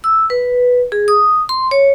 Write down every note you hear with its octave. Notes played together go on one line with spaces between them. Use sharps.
E6
B4
G#4
D#6
C6
C#5